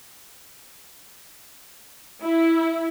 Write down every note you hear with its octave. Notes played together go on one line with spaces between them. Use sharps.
E4